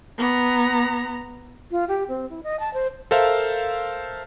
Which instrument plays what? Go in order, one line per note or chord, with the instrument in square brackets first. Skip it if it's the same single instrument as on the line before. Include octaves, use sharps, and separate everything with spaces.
[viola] B3 A#5
[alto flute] F4
G4
C4
E4
D#5
A5
C5
[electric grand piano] A4 A#4 C5 E5 F5